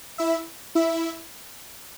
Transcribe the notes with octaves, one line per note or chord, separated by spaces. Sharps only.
E4 E5
E4 E5